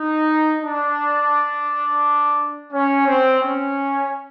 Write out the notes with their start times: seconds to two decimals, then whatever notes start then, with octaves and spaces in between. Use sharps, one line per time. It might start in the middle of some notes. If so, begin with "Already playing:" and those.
Already playing: D#4
0.62 D4
2.72 C#4
3.07 C4
3.43 C#4